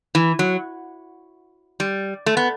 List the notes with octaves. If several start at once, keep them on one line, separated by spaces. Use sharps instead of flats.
E3
F#3
G3
A3
B3